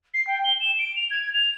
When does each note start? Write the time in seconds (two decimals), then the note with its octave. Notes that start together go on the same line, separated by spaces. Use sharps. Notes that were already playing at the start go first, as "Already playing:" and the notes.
0.14 C7
0.27 G5
0.44 G7
0.60 E7
0.79 D7
0.96 F7
1.11 G#6
1.33 F7